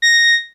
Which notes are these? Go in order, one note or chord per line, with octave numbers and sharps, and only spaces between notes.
A#6